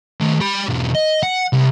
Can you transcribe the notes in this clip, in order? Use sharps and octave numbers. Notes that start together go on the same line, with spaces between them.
D#3 A3
G4 B5
B1 E2
D#5
F#5
C2